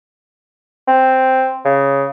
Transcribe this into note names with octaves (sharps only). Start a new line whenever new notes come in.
C4
C#3